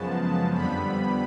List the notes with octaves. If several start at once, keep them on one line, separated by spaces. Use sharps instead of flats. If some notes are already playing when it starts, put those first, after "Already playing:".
Already playing: F#2 C#3 F3 G#3 B3 A5
F2 D3 G3 B3 B5